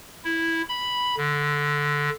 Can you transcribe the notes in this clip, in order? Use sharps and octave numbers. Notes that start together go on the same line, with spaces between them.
E4
B5
D3